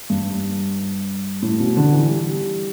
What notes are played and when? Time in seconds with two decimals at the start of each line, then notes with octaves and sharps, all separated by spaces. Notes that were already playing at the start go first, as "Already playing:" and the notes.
0.10 G2
1.42 A2
1.60 B2
1.77 D3
1.93 E3
2.09 G3